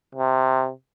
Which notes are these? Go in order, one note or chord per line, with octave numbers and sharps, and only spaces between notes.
C3